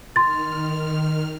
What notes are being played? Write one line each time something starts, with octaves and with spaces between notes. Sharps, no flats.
D#3 C6 F6 A6